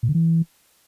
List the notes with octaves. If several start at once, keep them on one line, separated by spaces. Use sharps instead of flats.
A#2
D3
E3